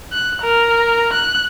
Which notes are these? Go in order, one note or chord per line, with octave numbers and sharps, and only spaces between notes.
F#6
A#4
F#6